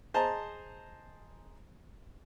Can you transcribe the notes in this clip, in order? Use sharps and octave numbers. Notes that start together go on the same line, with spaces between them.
G#4 C5 D#5 A5 A#5